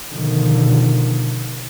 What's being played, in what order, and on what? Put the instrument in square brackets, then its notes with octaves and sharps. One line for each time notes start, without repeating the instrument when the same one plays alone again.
[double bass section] B2 D3 D#3 F3